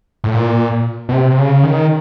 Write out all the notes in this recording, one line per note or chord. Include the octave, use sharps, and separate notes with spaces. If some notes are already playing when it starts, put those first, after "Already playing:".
A2
A#2
B2
C3
C#3
D#3